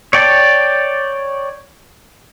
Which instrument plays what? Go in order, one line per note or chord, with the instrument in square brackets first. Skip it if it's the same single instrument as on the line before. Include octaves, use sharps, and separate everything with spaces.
[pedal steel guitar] C#5 D5 G5 A5